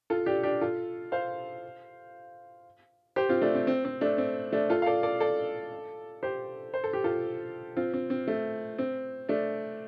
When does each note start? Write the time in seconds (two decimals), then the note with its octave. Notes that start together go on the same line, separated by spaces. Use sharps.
0.10 F4 A4
0.26 D4 G4
0.43 D4 G4
0.61 F4 A4
1.12 C5 F5
3.16 G4 C5
3.29 C4 F4
3.42 A3 D4
3.55 C4
3.67 C4
3.85 C4
4.01 A3 D4
4.18 C4
4.52 A3 D4
4.70 F4 A4
4.82 F5
4.86 A4 D5
5.03 A4 D5
5.20 A4 D5
6.23 G4 C5
6.74 C5
6.84 A4
6.93 G4
7.04 F4 A4
7.76 C4 F4
7.93 C4
8.10 C4
8.28 A3
8.78 C4
9.29 A3 D4